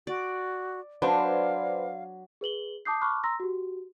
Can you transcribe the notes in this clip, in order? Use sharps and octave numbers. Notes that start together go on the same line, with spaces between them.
F#4 D5
F#3 D4 B4 C5 D5 F5
G#4 B4 F#7 G7
A5 D6 D#6 G6 C7
A5 B5 C#6 D6 F6 F#6
A#5 C6 E6 A#6
F#4 G4